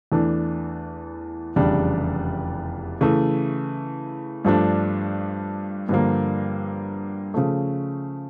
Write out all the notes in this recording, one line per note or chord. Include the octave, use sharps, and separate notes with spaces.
E2 E3 A3 D4
F1 E2 C#3 G3 D4
C#3 E3 A3
G2 F3 A3 D4
G2 D3 F3 A#3
C#3 F3 A3